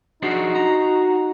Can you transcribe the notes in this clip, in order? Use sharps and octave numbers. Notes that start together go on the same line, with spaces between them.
D4 D#4 F#4 G#4 C5
A#5